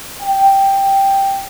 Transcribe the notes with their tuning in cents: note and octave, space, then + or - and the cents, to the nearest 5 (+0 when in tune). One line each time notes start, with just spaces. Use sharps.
G5 +0